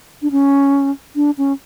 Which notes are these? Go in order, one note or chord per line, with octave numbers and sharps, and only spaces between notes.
D4
C#4
D4
C#4